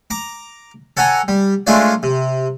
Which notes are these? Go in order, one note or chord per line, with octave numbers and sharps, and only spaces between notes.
A#5 D6
A4 C#5 F#5 G#5 A#5
G3
G#3 A3 D4 F4 C#5 D5
C3